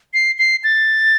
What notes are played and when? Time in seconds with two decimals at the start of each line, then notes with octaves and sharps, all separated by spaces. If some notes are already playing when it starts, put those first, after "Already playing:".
0.14 C7
0.39 C7
0.64 A6